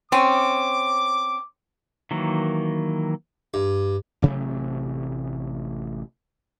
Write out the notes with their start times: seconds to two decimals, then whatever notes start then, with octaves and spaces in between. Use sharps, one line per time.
0.12 C4 C#4 D6
2.11 D#3 E3 F#3 A#3
3.54 G2
4.22 A1 C3 F#3 A3